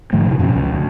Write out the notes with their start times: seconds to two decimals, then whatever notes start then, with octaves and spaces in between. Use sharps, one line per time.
0.13 G#2 D3 F3 A3
0.27 A2 C3
0.39 F#2 B2 F3 C#4
0.55 C#2
0.71 D2